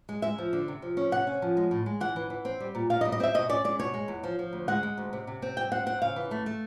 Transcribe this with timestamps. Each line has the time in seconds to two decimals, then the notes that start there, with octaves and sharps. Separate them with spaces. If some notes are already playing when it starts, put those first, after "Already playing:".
0.09 G#3
0.22 G#3 E5
0.38 F3
0.53 D3
0.68 C3
0.82 F3
0.97 C#4
1.12 C3 F#5
1.27 C#4
1.42 F3
1.57 G#3
1.71 A2
1.86 G#3
2.00 E3 F#5
2.16 E3
2.30 E3
2.45 C4
2.60 G3
2.75 A#2
2.90 A#2 F5
3.01 D#5
3.05 G3
3.12 D#5
3.20 C4 E5
3.34 B2 D#5
3.49 C#4 D5
3.64 G#3 D5
3.79 B2 C#5
3.94 G#3
4.08 E2
4.24 F3
4.39 F3
4.53 D2
4.68 G#3 F#5
4.83 G#3
4.98 D2
5.13 C3
5.27 C3
5.42 C4
5.57 G3 G5
5.72 C4 F#5
5.86 C4 F#5
6.02 C#3 F5
6.16 E3
6.31 A3
6.46 A3